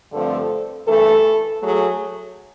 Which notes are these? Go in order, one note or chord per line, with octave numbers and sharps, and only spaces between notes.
G2 D3 F3 A3 C4 A4
G2 E3 A3 A4
F#3 A3 G#4